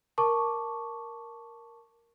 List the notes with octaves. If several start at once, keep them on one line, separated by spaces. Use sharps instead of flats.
A#4 A5 C#6 D6